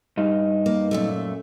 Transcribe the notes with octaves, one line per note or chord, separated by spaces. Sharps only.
G2 D#4
A#3
F#2 A#2 A3